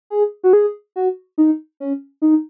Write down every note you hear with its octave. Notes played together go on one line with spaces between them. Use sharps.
G#4
F#4
G#4
F#4
D#4
C#4
D#4